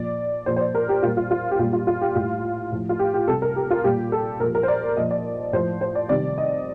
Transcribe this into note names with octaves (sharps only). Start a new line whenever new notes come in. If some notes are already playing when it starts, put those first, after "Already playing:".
Already playing: A#2 F3 D5
A#2 F3 C5
C5
D5
A#4
G4
A#2 G3 F4
F4
F4
G4
A#2 G3 F4
F4
F4
G4
A2 G3 F4
A2 F3
F4
G4
G4
C3 G3 A4
A#4
G4
F4
A#2 G3 G4
A4
A#2 F3 A#4
A#4
C5
D5
A#2 F3 D#5
D5
A2 F3 C5
C5
D5
C3 D#3 G3 D5
D#5